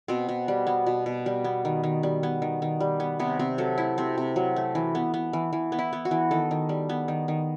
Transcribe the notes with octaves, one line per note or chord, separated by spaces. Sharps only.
B2 C4
B2
G3
B3
B2
B2
G3
B3
D#3
D#3
G3
B3
D#3
D#3
G3
B3
C3 B3
C3 C4
F#3 A4
A3 E4
C3 C4
C3
F#3
A3
E3
B3
B3
E3
E3
B3
E4
B3
F#4
E3
D#3 A4
D#3
G3
B3
D#3
D#3